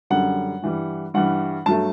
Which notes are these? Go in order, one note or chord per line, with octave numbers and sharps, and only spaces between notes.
F#2 D3 G3 F#5
G2 E3 G3
G2 E3 G3 F#5
G2 F#3 A3 A5